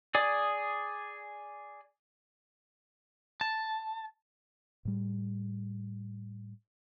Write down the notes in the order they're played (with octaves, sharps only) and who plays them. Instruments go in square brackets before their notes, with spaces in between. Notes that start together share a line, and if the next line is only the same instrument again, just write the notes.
[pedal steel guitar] G#4 D5 G#5 D#6
[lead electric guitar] A5
[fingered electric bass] A2 G3